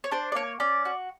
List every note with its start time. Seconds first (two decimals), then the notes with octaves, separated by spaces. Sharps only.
0.04 C#5
0.12 D4 C5
0.32 D5
0.35 A#3 C#5
0.60 C#4 D5
0.85 F#4